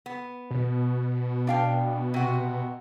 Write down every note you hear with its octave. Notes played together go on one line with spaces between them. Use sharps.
B3
B2
D4 F5 G5
C3 F#4